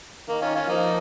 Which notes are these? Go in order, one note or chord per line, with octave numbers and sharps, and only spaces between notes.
D#3 A#3
C#4 F4
C#4 F4
F3 A#3 D#4